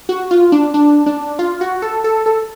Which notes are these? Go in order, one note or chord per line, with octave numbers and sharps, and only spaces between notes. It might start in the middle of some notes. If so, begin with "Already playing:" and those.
F#4
F4
D4
D4
D4
F4
F#4
A4
A4
A4